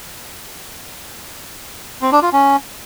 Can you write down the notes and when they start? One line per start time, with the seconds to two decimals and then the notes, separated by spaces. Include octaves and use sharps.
2.02 C4
2.12 D4
2.22 F4
2.33 C#4